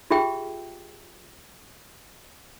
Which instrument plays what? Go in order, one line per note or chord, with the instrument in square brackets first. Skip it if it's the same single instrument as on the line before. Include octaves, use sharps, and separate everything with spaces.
[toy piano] F4 G4 G#4 E5 G5